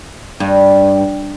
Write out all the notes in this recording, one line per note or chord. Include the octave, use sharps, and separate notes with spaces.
G2